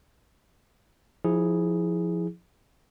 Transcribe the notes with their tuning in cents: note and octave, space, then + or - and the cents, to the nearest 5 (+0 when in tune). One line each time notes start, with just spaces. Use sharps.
F3 +0 E4 -25 G#4 +0